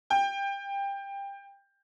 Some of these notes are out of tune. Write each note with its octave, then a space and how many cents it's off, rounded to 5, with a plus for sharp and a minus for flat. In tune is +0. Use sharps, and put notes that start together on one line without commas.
G5 +20